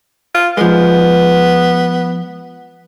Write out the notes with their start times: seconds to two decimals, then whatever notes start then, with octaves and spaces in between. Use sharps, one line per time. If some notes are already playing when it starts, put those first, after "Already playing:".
0.35 F4
0.57 F3 G#3 B3